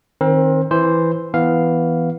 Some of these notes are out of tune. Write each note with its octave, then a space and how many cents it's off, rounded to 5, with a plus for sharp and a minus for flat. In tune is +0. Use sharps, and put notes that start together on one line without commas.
D#3 +0 C4 +25 A#4 +40
E3 +0 C5 +0
E3 +0 B3 +0 F5 +0